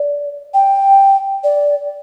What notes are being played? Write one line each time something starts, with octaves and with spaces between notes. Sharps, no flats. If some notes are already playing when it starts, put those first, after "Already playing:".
Already playing: D5
G5
D5